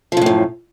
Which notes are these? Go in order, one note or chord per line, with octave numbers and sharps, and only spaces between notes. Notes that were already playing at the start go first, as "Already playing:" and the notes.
F#2 A2 C#3 F3